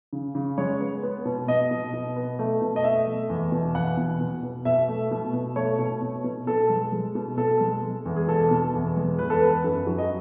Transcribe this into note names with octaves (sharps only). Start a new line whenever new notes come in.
C#3
C#3
G#3 C#5
B3
B3
B2
B2 D#5
B2
B2
B3
A3
B2
D#5
A3 E5
A3
E2
B2
E2 F#5
B2
B2
B2
B2 E5
A3
B2
B2
A3 C#5
B2
B2
B2
B2 A4
G#3
G#3
B2
B2 A4
G#3
G#3
E2
G#4
B2 A4
B2
E2
G#3
E2 B4
A4
B3 B4
F#2
F#3
D#5